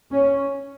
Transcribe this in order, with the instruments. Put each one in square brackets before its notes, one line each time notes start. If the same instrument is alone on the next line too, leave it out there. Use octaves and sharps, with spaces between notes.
[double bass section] C#4